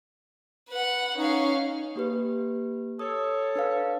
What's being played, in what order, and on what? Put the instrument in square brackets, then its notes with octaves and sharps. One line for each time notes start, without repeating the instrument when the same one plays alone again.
[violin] B4 F#5
[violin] C#4 F5 [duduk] D#4
[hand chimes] A#3 G4 B4
[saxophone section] A4 C#5 [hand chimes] D#6
[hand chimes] D4 B4 F5